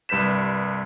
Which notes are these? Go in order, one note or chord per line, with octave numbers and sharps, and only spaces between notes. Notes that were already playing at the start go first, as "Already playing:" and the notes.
C2 G2 B4 G6 B6 E7